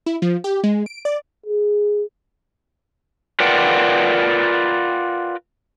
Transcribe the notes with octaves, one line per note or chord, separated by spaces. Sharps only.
E4
F3
G4
G#3
D7
D5
G#4
F4 A#4 B4 D5 F#5 G5